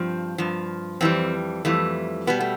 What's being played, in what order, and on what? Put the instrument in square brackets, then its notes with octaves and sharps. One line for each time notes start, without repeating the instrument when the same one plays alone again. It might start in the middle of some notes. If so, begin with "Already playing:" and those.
Already playing: [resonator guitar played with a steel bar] G2 F3 C4
G2 F3
F2 E3 G3 C4
F2 E3 G3 A3
B2 G3 B3
A3